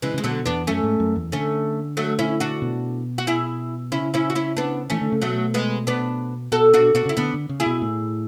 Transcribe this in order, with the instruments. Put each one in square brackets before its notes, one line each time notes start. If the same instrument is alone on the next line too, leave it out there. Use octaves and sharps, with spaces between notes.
[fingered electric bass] C#3 [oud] E3 G#3
[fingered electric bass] C#3 [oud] G#3
[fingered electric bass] B2 [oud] D3 F#3
[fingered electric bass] E2 [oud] B3 D4
[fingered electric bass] F#2 [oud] A3 C#4
[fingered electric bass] G#2
F#2
E2
[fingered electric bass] D3 [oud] A3 C#4
[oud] F#3 A3
C#4 E4
D4 F#4
[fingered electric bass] B2
[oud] F#4
E4 G#4
[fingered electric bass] C#3 [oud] C#4 E4
[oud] C#4 E4
F#4
C#4 E4
B3 D4
[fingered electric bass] E3 [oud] A3 C#4
[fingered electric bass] D3
C#3
[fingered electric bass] B2 [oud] F#3 A3
[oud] G#3 B3
B3 D4
[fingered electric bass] B2 [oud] F#4 A4
[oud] D4 F#4
[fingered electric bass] B2 [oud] D4 F#4
[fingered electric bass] C#3 [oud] E4
[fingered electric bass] D3 [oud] B3 D4
[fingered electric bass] D3
C#3
[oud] E4 G#4
[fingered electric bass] B2
A2